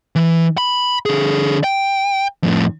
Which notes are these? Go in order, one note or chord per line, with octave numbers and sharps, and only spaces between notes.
E3
B5
D3 G#4
G5
F2 A2